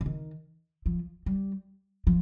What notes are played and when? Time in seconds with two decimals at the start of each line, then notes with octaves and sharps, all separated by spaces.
0.01 D3
0.06 D#3
0.86 F3
1.26 G3
2.07 F3